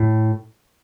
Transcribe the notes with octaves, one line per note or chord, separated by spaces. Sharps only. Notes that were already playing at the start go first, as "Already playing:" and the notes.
Already playing: A2